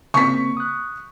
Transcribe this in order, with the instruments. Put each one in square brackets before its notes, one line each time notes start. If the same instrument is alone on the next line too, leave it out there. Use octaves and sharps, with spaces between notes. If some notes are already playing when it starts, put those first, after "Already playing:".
[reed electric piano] C#3 A#3 C4 [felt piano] C#6 B6
[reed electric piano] D#6 F#6